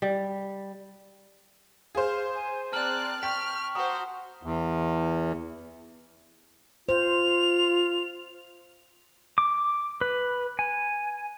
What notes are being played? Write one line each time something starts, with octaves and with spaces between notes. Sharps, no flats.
G3
G#4 C5 F5
G#5
C4 D5 A5 A#5 F6 F#6 F#7
G5 C#6 F6 B6
F#4 C5 A#5 D#6
E2
F4 C5 F7
D6
B4
G#5